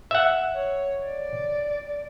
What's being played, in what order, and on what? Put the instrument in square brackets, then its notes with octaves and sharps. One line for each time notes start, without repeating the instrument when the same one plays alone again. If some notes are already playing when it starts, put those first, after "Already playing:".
[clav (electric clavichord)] E5 F#5
[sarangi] C#5
D5